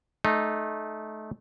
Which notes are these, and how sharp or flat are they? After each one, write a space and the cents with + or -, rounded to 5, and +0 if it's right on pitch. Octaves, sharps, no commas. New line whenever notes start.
A3 -25 D#4 -15